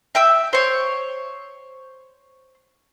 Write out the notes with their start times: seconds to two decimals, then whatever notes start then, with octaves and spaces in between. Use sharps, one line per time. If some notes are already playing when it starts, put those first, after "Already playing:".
0.15 E5 G5 E6
0.53 C5 C#5